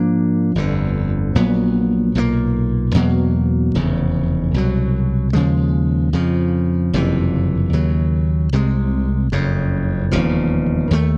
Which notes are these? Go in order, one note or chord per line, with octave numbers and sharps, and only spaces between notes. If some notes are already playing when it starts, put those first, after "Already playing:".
Already playing: G#2 F3 A#3 D4
G1 F2 D3
A#1 A#2 F#3 B3
B1 A#2 G3 A#3
E2 B2 F#3 A#3
F1 E2 C#3
C2 B2 F#3
D#2 C#3 F3 G#3
F2 C#3 F3
F#1 F2 C3 E3
D#2 C#3 F#3
C2 C3 E3 G#3
F#1 F2 C#3
E1 D#2 C#3 F3
D#2 D#3 F#3 A3